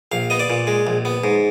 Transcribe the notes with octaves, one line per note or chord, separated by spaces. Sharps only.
A#1 F5
B3 D#5
D5
A#2
G#3
A#1
B3
G#2